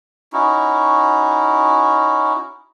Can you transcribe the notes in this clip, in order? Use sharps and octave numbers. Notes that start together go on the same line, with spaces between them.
C#4 D#4 E4 F#4